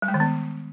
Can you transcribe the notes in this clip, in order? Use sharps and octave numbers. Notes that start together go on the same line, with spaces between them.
G3
G#3
D#3
B3